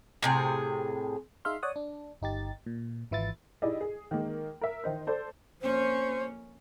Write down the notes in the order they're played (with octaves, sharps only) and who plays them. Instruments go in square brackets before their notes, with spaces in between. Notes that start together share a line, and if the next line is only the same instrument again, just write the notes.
[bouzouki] A2 C3 G#4
[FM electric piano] D#4 G#4 E5 F5 C6
C#5 D5 F#5 D#6
D4
G1 D#4 G4 A6
A#2
G#1 E3 E4 F4 A6
[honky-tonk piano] D#4 E4 G4 G#4 D5 D#5
G#4
D#3 G#3 A#3
A#4 E5
D#3 D#4 C5
A4 C5 D5
[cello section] F2 A#3 C#4 [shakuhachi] C5